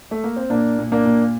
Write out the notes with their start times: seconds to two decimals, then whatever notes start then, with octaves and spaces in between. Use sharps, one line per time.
0.11 A3
0.24 A#3
0.36 C4
0.50 A#2 A#3 D4
0.78 A#2
0.92 A#3 D4
1.05 A#2